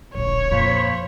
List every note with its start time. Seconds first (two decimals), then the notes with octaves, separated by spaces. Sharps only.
0.15 D1 A#1 C#5
0.51 F2 A#2 F3 C5 B5